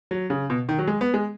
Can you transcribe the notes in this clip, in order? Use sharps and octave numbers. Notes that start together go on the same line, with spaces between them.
F#3
C#3
B2
D#3
F#3
G#3
B3
G#3